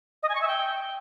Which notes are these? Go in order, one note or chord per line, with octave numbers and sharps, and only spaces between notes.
D#5
G#5
C#6
E5
G5